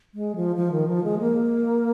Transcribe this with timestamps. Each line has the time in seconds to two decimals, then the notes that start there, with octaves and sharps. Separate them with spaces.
0.14 G#3
0.36 F3
0.56 F3
0.72 D#3
0.88 F3
1.04 G#3
1.19 A#3